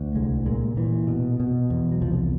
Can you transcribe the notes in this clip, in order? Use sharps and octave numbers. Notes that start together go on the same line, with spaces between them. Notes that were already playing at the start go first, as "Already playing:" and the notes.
Already playing: D2
C2 G#3
A#2 G#3
A#2 E3
B2
B2
E2
F#3
C2 F3